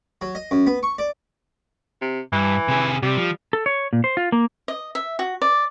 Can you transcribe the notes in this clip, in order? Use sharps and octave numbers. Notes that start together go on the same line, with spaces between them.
F#3
D#5
F#2
B3
C#6
D5
C3
G2 E3
C3 G#4
C3 G3
F3
A4
C#5
A#2
C5
F4
A#3
D#5
E5
F#4
D5